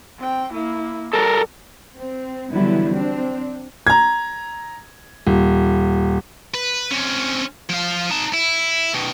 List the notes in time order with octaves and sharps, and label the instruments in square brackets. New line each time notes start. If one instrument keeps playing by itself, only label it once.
[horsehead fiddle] C4 G5
A#3 E4
[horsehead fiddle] G3 [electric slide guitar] A4 A#4
[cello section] C4
D3 E3 F#3 G3 B3 E4
C4 D4
[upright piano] A#5 G#6
D#1
[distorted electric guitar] B4
C4 C#4
F3 F5
D#4 A5
E4
B2 D#3